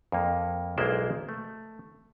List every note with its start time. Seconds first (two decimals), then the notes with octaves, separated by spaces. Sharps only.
0.12 F2 A#3
0.78 B1 G#3 A#3 E4 C5 D5
1.29 A3